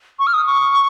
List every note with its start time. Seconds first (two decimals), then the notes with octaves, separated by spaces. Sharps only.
0.19 C#6
0.27 F6
0.33 D#6
0.46 C#6